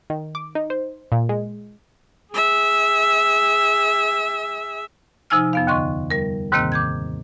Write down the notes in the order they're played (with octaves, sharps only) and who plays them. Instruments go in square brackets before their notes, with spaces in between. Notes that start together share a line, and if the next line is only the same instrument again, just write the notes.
[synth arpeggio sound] D#3
D6
D#4
C5
A#2
G#3
[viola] G#4 E5
[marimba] C3 F3 D#4 G#5 E6 F6
F2 B3 F5
D#2 D3 D#5 C6 C#6
G3 A#4
D#2 G#2 C3 D#3 A#3 C4
D6 G6 G#6